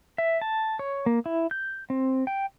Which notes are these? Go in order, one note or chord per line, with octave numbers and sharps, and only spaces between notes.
E5
A5
C#5
A#3
E4
G6
C4
G5